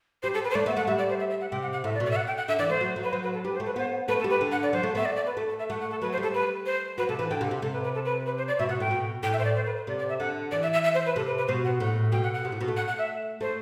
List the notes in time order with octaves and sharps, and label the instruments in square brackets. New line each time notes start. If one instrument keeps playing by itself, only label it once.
[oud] G3 [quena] C5
[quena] A4
B4
C5
[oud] A3 [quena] D5
[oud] B3 [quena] E5
[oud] A3 [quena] F#5
[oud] G3 [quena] E5
[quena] D5
C5
E5
E5
F#5
[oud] C3 [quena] G5
[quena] F#5
F#5
[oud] A2 [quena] E5
[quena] D5
[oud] B2
[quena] D5
E5
F#5
G5
F#5
[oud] D3 [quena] E5
[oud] E3 [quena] D5
[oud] A3 [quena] C5
[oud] F#3
F#3
[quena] B4
[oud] F#3 [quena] C5
[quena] B4
A4
[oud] G3 [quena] B4
[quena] C5
[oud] A3
[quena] B4
[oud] B3 [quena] C5
[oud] A3 [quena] B4
[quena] A4
[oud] G3
[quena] B4
[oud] D3
[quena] F#5
D5
[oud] F#3 [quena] C5
[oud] A3
[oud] B3 [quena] E5
[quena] D5
D5
B4
[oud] A3 [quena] A4
[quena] A4
E5
[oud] A3 [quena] F#5
[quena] F#5
A4
[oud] F#3 [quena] B4
[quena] C5
[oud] G3
[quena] A4
B4
C5
[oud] F#3 [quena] B4
[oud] C3 [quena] A4
[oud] E3 [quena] B4
[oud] D3 [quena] G5
[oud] C3 [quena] F#5
[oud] C3
[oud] C3 [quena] A4
[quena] B4
B4
A4
B4
B4
C5
D5
[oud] B2 [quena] E5
[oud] B2 [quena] F#5
[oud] A2 [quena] G5
[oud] B2
[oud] A2 [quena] G5
[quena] E5
C5
D5
C5
B4
C5
[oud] C3 [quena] D5
[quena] D5
E5
[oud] D3 [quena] F#5
[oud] E3 [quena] D5
[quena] E5
E5
E5
C5
B4
[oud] C3 [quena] A4
[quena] B4
B4
[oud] B2 [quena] C5
[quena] F#5
[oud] A2 [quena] F#5
[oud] B2 [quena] G5
[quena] F#5
F#5
[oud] C3
A2
B2
A3
[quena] F#5
F#5
E5
[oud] A3 [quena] C5